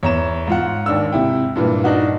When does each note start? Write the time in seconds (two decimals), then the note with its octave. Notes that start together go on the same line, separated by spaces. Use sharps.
0.03 E2 C#5 A#5 E7
0.47 G#2 F4 F#5
0.86 D#2 D4 E6
1.12 C3 E4 G5
1.56 G2 A#2 E3
1.84 D4 D#4 F#4